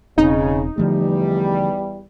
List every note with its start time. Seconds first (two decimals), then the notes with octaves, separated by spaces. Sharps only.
0.18 E1 C#3 C4 D#4
0.78 E2 D3 F3 G3 A3